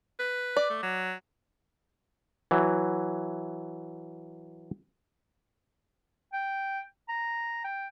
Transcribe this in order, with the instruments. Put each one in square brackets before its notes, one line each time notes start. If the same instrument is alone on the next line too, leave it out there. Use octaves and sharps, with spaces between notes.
[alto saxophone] B4
[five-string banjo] D5
[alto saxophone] A3
F#3
[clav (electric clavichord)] E3 F#3
[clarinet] G5
A#5
G5